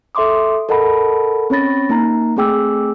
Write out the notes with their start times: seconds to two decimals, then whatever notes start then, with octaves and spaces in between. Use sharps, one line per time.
0.15 A4 E5 C6 D6 D#6
0.69 A4 A#4 D#5 F#5 A5 B5
1.50 C4 C#4 C#5 B5 A6 A#6
1.90 A#3 D#4 A#5
2.37 A3 C4 G#4 G5 D6 E6